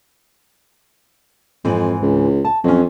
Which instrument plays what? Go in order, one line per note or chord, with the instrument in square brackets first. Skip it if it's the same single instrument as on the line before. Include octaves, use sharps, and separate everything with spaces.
[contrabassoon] F2 [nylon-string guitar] G#2 E3 C4
[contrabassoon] C#2
[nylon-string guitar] A5
[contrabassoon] F2 [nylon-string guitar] F#3 C#4